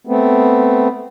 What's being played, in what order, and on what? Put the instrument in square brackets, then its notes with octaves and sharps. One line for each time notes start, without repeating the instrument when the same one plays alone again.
[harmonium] A3 B3 C4